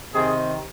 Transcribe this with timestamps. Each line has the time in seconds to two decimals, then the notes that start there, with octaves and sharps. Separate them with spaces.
0.13 C3 D#3 C4 G#4